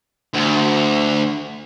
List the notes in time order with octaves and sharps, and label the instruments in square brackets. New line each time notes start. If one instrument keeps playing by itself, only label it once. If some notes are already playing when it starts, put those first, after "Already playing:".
[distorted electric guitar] D2